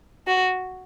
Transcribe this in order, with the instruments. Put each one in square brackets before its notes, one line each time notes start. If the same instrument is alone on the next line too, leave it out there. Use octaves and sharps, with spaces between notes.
[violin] F#4